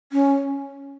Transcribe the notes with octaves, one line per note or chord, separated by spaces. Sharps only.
C#4